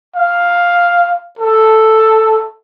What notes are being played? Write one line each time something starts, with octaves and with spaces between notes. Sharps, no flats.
F5
A4